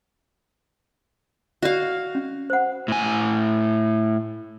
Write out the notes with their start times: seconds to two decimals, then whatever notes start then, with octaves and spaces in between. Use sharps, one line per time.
1.62 F#4 D5 D#5 F5
2.15 C#4
2.50 C5 F#5
2.88 A2 G#5